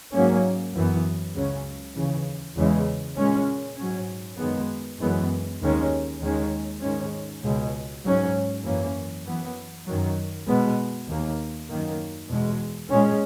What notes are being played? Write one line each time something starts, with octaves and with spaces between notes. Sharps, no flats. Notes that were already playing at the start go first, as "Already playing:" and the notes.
G#2 F#3 A#3 C#4
F#2 E3 B3
C#2 C#3 F#3 C#4
D#2 C#3 E3
E2 C#3 E3 G#3
A#2 G#3 C#4
G#2 F#3 C#4
F#2 D#3 G#3 B3
F#2 E3 G#3 B3
D#2 D#3 G#3 C#4
D#2 D#3 G#3 C#4
G#2 D#3 G#3 C#4
C#2 B2 G#3
G#2 F#3 C#4
F#2 E3 A#3 C#4
F#2 E3 B3
F#2 D#3 F#3
B2 G#3 B3
D#2 D#3 A#3
F#2 D#3 A#3
E2 B2 G#3
A#2 G#3 C#4